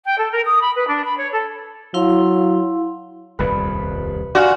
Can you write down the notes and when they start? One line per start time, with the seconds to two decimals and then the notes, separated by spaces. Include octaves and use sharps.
0.05 G5
0.18 A4
0.32 A#4
0.45 D#6
0.61 B5
0.75 B4
0.88 D4
1.05 B5
1.17 C#5
1.33 A4
1.94 F#3 E4 F5 C6
3.39 D#1 C2 F2 B4
4.35 F4 F#4 D5 F5 F#5 G#5